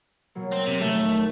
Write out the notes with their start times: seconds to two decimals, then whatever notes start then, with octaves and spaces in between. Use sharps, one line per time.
0.35 B2 F#3 A#3
0.53 C4
0.67 C3
0.81 A#1 D#2 A3